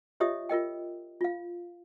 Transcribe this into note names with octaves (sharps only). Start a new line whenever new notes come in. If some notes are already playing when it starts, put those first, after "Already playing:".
F4 G4 C#5 D#5 E5 D#6
F4 A#4 D#5 G5
F4 F5